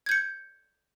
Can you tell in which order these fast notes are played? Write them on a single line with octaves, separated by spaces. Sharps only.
G#6 G6 C#7